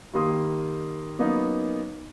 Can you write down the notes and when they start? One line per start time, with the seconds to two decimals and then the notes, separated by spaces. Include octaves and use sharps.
0.14 D#3 G3 A#3 C6 D#6
1.19 F#3 A#3 B3 C#4 D#4